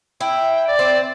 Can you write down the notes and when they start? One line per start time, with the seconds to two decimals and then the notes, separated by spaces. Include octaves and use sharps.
0.21 E4 G5
0.67 D5
0.79 C4